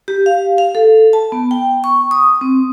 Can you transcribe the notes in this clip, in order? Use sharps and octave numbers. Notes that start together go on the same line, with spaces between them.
G4
F5
F5
A4
A5
B3
G5
C#6
D#6
C4